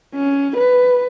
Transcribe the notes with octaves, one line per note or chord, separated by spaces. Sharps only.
C#4
B4